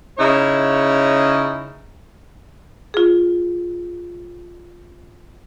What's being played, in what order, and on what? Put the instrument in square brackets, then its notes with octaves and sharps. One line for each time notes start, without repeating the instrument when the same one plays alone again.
[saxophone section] C#3 D#4 E4 C#5
[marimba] F4 G#4